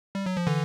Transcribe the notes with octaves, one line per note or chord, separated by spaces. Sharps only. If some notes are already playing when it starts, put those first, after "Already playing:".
G3
F#3
F3
D3 E3